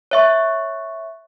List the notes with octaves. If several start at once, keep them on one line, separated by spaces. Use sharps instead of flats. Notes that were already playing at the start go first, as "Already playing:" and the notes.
C#5 E5 C#6